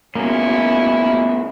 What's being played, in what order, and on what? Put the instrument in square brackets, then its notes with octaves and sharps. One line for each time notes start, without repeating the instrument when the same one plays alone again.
[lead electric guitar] G2 B2 [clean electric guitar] A#3 [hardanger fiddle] C#4 E4